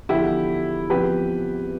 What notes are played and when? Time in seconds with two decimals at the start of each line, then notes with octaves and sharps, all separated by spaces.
0.09 E2 D3 F3 E4 G4
0.90 E2 C3 F3 G4 B4